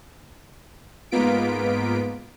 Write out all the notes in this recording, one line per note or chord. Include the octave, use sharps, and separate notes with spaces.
G#2 A#3 B3 F4 B6 D7